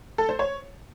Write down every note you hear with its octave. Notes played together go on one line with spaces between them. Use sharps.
A4
C5
C#5